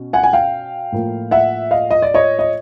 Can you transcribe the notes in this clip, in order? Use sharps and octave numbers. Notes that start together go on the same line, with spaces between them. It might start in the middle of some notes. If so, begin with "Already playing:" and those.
Already playing: B2 C#4
F#5 G#5
G#5
F5 G5
A2 F3 A#3
E5 F#5
D#5 F5
D#5
D5
C#5 D#5
D#5